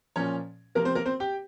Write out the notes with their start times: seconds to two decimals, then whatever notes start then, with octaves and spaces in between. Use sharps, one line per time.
0.16 A#2 F3 C#4 C#5
0.75 C3 F3 A#3 A#4
0.85 C4 C5
0.95 A#3 A#4
1.05 C4 C5
1.20 G4 G5